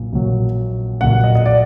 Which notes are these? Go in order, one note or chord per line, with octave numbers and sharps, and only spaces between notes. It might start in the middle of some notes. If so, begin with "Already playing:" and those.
Already playing: A#1 A#2 F#3
A#1 A#2 F#3
A#1 A#2 F#3 F#5
D#5
D#5
D5